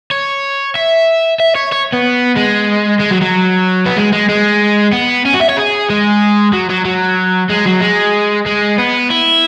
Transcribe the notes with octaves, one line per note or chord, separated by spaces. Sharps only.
C#5
E5
E5
C#5
C#5
B3
G#3
G#3
F#3
F#3
B3
G#3
G#3
G#3
B3
C#4
F#4
E5
C#5
G#4
G#3
F#3
F#3
F#3
G#3
F#3
G#3
G#3
B3
E4